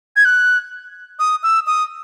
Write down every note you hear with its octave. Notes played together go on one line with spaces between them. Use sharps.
G#6
F#6
D#6
E6
D#6